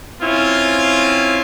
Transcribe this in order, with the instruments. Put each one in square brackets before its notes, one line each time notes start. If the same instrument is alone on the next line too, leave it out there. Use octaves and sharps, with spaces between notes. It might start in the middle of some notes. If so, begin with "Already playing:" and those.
[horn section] C4 C#4 E4 F4